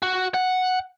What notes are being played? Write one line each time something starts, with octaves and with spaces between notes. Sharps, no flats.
F#4
F#5